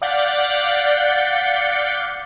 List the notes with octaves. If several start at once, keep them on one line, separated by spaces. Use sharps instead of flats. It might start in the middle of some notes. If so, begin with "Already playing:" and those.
D5 F5 F#5 G6 A6 B6